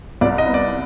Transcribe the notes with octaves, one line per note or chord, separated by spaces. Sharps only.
C2 D5
D#5
B3
D5